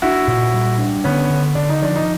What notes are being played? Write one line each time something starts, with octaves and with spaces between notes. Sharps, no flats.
D4 E4 F#4
A#2
G3
D4
D3 B3 C#4
D3
D3 D4
D#4
F3 D4
D#4